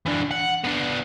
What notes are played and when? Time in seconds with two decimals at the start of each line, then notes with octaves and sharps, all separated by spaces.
0.06 E3 D4
0.31 F#5
0.64 B3 D4